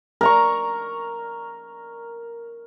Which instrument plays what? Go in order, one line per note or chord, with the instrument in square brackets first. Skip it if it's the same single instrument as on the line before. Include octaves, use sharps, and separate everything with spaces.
[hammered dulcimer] A#4 A#5 C#6